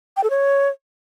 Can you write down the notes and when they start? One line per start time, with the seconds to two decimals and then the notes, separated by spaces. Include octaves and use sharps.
0.17 G5
0.24 A4
0.30 C#5